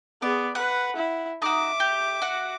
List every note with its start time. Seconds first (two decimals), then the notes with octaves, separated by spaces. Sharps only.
0.22 B3 G#4 D5
0.55 B4 F#5
0.96 E4
1.42 D#4 F#4 E5 D6
1.80 G4
2.22 F#4 F#5